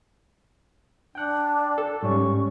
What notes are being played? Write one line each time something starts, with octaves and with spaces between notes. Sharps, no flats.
D4 G5 F#6
A4
G#2 G3 C#4 C#6